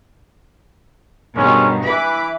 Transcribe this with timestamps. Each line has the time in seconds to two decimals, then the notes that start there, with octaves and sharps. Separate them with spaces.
1.35 G2 B2 D#3 G#3 C#4
1.85 E3 B4 B5 D6